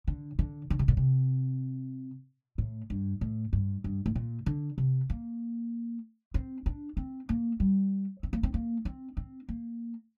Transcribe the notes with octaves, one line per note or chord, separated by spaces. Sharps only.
D3
D3
D3
C3
A#2
C3
A2
G2
A2
G2
G2
A2
A#2
D3
C3
A#3
C4
D4
C4
A#3
G3
C4
A#3
C4
A#3
C4
C4
A#3